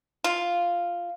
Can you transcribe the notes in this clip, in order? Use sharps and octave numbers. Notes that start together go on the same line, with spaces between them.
F4